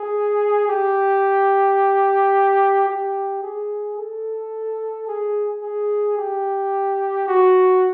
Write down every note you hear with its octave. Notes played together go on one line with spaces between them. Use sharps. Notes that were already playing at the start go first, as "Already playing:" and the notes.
Already playing: G#4
G4
G4
G#4
A4
G#4
G#4
G4
F#4